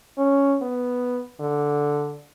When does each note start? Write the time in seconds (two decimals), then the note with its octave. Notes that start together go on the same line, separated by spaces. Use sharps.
0.18 C#4
0.62 B3
1.40 D3